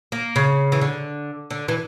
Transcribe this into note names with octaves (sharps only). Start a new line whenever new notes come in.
A#3
C#3
E3
D3
D3
E3